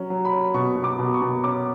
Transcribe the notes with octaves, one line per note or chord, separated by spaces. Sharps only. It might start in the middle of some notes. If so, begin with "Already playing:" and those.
Already playing: F#3 C#4
F#3
B5
C#4
B2 C#6
B2
D6
B2
C#6
B2
C#4 D6